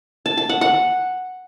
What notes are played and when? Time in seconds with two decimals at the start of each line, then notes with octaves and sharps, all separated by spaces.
0.26 A5
0.38 A5
0.49 F#5
0.61 F#5